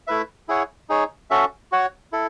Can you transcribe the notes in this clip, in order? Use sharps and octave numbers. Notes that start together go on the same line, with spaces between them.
A3 E4 B4 E5
E4 G#4 C#5 F#5
D#4 G#4 C#5
C#4 F#4 A4 E5
F#4 C#5 F#5
E4 A4